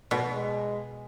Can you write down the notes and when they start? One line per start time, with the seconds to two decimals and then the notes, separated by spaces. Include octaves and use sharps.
0.11 B2
0.32 G#3